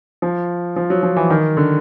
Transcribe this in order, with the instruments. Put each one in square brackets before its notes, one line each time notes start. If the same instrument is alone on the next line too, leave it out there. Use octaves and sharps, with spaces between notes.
[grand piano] F3
F3
F#3
F3
E3
D#3
D3